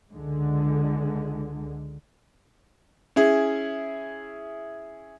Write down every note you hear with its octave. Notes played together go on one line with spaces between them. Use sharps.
C#2 D3 G#3
C#4 E4 G#4